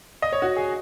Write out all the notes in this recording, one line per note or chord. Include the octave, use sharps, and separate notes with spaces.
D#5
C#5
F#4
G#4